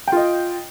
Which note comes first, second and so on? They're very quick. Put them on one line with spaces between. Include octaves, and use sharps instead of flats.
G5 F4 D#5